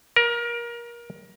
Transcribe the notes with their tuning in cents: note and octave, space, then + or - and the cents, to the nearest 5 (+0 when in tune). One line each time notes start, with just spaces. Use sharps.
A#4 +25